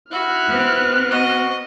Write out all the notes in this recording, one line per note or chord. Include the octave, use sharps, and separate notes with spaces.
E4 F#4 F6 F#6
B3 C4
F#4 D#5